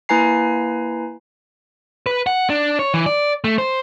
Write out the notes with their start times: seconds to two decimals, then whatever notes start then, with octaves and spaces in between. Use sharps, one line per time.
0.09 A#3 E4 B4 G#5 A#5 C7
2.06 B4
2.27 F#5
2.50 D4
2.79 C#5
2.94 E3
3.06 D5
3.44 A3
3.58 C5